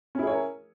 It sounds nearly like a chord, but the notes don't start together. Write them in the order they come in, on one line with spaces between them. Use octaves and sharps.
C#4 E4 G#4 C#5 A#4